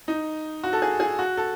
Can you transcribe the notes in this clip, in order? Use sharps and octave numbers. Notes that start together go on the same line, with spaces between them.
D#4
F#4
A4
G#4
G#4
F#4
A4